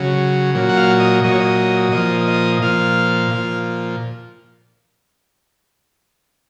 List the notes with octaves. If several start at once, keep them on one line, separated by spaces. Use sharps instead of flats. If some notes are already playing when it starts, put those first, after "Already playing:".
Already playing: C#3 F#3
A#2 F#3
F#5
F5
D#5
A#2 F#3 D#5
C#5
D#5
A#2 F3 D#5
D#5
A#2 F3 F5
A#2 F3